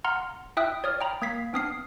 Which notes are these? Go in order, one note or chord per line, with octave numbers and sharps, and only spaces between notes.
F#5 A#5 C6 F6
E4 E5 G5 D#6 E6 F#6
C#5 D5 D#6 F6
G5 A#5 B5
A#3 G#6 B6 C7
B3 C4 D4 D#6 F6 C7